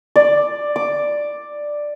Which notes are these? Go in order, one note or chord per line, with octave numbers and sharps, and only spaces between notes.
D5
D6